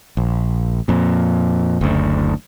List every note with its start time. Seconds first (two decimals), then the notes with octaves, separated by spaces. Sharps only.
0.17 A#1
0.88 F2 A#2
1.81 F#1 D2